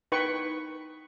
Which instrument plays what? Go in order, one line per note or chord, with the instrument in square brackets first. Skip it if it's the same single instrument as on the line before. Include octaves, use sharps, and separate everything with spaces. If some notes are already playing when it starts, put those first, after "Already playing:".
[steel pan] D#4 B4 G5 C#6